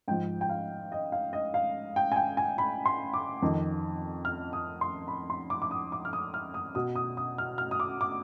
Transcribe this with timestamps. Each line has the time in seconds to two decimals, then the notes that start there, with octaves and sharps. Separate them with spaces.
0.08 G#2 F3 G5
0.41 G5
0.49 F5
0.92 D#5
1.12 F5
1.33 D#5
1.54 F5
1.96 G5
2.12 G#5
2.16 G5
2.37 G#5
2.58 B5
2.86 C6
3.14 D6
3.42 F2 D#3
4.25 F6
4.53 D#6
4.81 C6
5.08 B5
5.30 C6
5.50 D6
5.62 D6
5.71 D#6
5.92 D6
6.05 F6
6.13 D#6
6.34 F6
6.54 D#6
6.75 B2 D#6
6.96 D#6
7.17 D#6
7.38 F6
7.58 F6
7.71 D#6
7.80 D6
8.01 D6